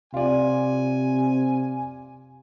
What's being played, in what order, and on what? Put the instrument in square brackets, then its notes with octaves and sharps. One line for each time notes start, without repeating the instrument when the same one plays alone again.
[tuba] C3 [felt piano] F4 D5 [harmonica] G#5